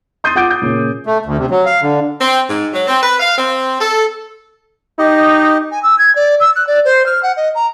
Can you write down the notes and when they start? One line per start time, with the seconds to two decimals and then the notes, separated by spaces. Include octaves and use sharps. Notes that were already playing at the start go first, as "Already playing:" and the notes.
0.24 C6 D#6 G6 A6 C7 D#7
0.35 F4 F#5 D6 G6 D7
0.50 G6
0.62 A#2 C#3
1.07 A3
1.26 D2
1.38 C3
1.51 F#3
1.66 F5
1.82 D3
2.21 C4
2.50 G#2
2.73 F#3
2.87 C4
3.03 B4
3.20 F5
3.38 C4
3.81 A4
4.99 D#4 G4 D#5
5.71 G#5
5.83 E6
5.99 G#6
6.15 D5
6.40 E6
6.56 F#6
6.67 D5
6.85 C5
7.06 F6
7.23 F#5
7.37 D#5
7.55 A#5